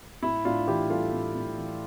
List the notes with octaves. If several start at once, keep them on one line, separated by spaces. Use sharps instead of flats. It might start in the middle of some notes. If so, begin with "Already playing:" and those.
A2 E4
A2 D4 F4
E3 E4 G4
G3 F4 A4
A2
A2
E3